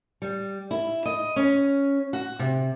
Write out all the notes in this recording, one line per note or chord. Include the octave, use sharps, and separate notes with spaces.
G3
E4
D#5
C#4
F#4
C3